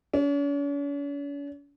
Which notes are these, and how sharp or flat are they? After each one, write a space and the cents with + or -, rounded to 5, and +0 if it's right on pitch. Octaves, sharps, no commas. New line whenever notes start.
C#4 +45